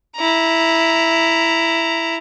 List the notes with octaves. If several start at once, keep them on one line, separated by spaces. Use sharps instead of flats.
E4 A#5